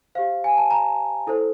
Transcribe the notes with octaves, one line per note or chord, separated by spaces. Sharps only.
G4 C5 F5
G#5
A5
A#5
E4 A4 C5